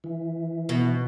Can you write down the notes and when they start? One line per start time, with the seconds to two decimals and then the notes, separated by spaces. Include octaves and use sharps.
0.04 E3
0.69 B2